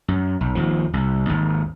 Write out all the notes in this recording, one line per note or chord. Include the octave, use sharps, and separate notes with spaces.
F#2
B1
G#1 D#2 F3
C2
G#1 D#2